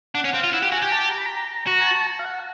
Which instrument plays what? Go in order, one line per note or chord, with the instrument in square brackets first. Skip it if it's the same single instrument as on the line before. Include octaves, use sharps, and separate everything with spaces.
[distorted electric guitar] D4 [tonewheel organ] F#5
[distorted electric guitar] C#4
[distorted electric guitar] C4 [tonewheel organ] F5
[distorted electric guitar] F4
[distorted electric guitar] E4 [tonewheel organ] F#5
[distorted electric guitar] G4
[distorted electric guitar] F#4 [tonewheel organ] G#5
[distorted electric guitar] G4
[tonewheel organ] A5
A#5
B5
A#5
[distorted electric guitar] F#4 [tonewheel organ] A#5
[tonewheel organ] G#5
A5
F5
F#5